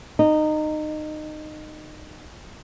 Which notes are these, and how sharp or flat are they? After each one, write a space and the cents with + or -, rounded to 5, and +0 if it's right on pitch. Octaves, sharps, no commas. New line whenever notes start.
D#4 -20